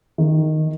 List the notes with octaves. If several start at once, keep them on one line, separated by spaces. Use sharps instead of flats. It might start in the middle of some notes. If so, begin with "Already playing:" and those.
D#3